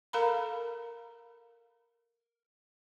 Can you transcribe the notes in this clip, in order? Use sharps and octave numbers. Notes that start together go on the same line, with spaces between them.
A4 A#4 F5 A#5 B5